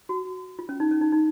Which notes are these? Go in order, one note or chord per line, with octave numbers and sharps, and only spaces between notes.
F#4
F4
C#4
D#4
C#4
D#4
D#4